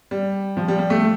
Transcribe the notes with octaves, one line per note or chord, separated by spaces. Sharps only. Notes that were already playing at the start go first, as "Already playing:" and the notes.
G3
F3
G3
G3
A3